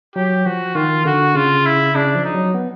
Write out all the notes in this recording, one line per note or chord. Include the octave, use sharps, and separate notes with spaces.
F#3 G4
F3 F#4
D#3 F4
D3 F#4
C#3 F4
E4
C#3 D4
F3
D#4
F#3
B3